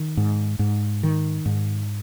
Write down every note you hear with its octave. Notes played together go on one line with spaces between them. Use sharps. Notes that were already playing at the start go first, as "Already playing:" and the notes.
Already playing: D#3
G#2
G#2
D#3
G#2